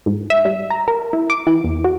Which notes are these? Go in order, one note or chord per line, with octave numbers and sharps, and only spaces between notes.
G#2
E5
G3
A#5
A#4
E4
D6
E3
E2
F#4